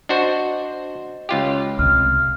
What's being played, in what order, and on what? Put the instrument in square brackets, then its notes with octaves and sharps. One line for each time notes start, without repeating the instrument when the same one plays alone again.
[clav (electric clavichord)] D4 F#4 C5 [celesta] D#5
[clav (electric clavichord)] C#2 F4 G4
[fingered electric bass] C2 C3 [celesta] F6